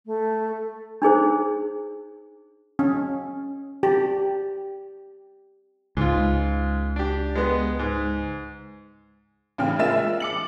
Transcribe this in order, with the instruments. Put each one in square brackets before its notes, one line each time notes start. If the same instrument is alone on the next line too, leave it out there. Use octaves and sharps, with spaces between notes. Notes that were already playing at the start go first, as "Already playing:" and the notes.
[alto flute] A3
[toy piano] D4 D#4 G#4 C5
[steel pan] C#4
G4
[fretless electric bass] C#2 [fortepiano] G#2 F4
[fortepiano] D4 G4
G#3 B3
G#2
[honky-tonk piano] A1 A2 C#3 G5 F6
A#2 G#3 A#4 E5 A6 E7
D6 C#7 F#7